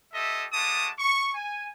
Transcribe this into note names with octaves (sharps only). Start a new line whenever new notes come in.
F4 G4 A4 D#5 E5
G#3 A3 F#4 A5 D6 D#6
C#6
G#5